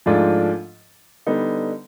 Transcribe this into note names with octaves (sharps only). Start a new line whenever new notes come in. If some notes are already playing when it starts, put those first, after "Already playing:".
G#2 F3 A3 D4 F4
D3 G3 B3 D#4